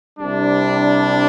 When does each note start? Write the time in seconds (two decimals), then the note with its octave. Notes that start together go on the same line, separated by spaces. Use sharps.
0.19 C2 C3 G3 D4